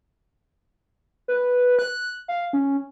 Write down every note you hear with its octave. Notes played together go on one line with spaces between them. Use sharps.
B4
F#6
F5
C#4